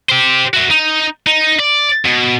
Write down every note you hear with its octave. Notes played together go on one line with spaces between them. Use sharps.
G4 C5
F#4 E5
D#4
D#4
D5
B2